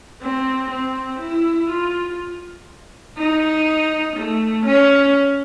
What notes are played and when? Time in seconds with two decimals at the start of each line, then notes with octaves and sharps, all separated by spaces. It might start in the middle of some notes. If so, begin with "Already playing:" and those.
0.22 C4
0.71 C4
1.20 E4
1.70 F4
3.18 D#4
4.17 A3
4.66 C#4